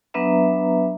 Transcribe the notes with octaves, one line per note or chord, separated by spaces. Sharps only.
F#3 B3 D4 B4 E5 A#5